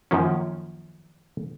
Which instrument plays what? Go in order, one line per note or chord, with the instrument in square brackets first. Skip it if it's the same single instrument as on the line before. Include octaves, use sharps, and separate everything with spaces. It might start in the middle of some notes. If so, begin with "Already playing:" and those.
[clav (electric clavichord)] F#2 D#3 F3 A#3 C#4